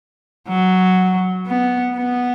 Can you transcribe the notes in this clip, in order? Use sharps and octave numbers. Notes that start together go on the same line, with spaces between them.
F#3
B3
B3